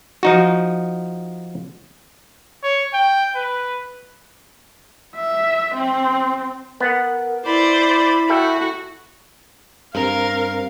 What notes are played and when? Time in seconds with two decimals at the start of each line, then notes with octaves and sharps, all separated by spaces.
0.23 F3 D#4 F#4
2.63 C#5
2.94 G5
3.35 B4
5.16 E5
5.75 C4
6.80 B3 A#4 F#5
7.46 E4 C5 D5 B5
8.29 F#4 A4 E5 G5
9.95 G2 C4 A#4 C5 F5